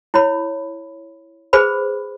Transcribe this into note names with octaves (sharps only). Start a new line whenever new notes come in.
E4 C#5 B5
G#4 B4 C5 B5